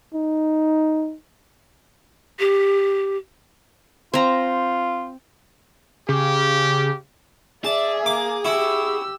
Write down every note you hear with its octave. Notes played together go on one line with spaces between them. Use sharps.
D#4
G4
C4 F4 A#5
C#3 G4
G#4 D5 E5 A5
A#3 D6
E4 F#4 G4 E6